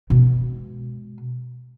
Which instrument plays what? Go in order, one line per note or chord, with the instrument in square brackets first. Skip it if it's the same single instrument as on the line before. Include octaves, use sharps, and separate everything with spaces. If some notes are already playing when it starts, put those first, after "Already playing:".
[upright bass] B2 G#3